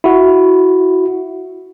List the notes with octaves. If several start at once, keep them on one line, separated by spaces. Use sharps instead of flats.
E4 F#4